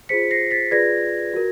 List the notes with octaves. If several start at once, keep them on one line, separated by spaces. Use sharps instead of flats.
F4 G#4 C5 B6 C#7
A#6 C7
A6 B6
F4 G#4 B4 D5 G#6 A#6
F#4 A#4